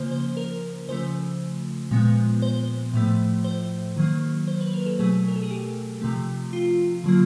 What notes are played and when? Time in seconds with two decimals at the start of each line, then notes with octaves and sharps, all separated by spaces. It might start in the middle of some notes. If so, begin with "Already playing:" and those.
Already playing: C#3 F3 A#3 C5
0.11 C5
0.37 A#4
0.89 C#3 F3 A3 C5
1.91 A#2 F3 G#3 B3
2.42 C5
2.94 A2 F3 A3
3.44 C5
3.96 D#3 F#3 A#3
4.48 C5
4.61 B4
4.73 A#4
4.86 A4
4.99 B2 F#3 A3 G#4
5.28 A#4
5.36 A4
5.42 G#4
5.51 G4
6.02 C3 F3 A3
6.53 F4
7.04 D3 F#3 A#3